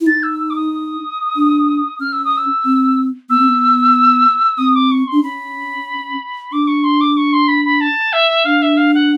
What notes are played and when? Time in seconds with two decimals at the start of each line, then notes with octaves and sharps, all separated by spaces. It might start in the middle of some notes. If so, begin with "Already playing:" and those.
0.01 E4
0.07 D#4 A6
0.23 E6
0.39 E6
0.50 D6
0.56 D#6
1.36 D4
2.00 C#4 F6
2.12 E6
2.25 D#6
2.37 E6
2.65 C4
3.29 B3 E6
3.39 C4
3.48 B3
4.58 C4 D#6
4.75 D6
4.91 C#6
5.07 D4 C6
5.22 C#4 B5
6.52 D4 D6
6.67 C#6
6.84 C6
7.01 D6
7.17 C#6
7.33 C6
7.48 B5
7.65 B5
7.81 A5
8.13 E5
8.45 D4 F5
8.62 E5
8.77 F5
8.94 F#5